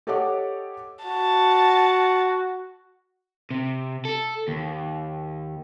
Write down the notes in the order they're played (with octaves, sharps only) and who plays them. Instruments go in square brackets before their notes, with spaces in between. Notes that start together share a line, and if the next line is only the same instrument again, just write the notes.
[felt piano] G4 A4 C#5 D#5 F#5 D6
[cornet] F#4 [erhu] A5
[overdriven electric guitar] C3
A4
D#2